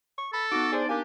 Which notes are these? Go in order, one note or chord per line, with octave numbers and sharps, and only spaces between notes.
C#6
A4 B5
B3 D#4 F#4 D6
D4 G#4 C5 D5
A#3 D4 G4 G#5